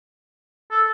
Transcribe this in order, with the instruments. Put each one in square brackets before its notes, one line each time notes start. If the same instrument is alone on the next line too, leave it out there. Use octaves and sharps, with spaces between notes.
[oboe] A4